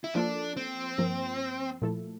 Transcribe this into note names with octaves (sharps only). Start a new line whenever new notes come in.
E4
F3 A#3 D4 F4 A4
C4
G2 F3 A#3
A#2 F3 A3 E4 A4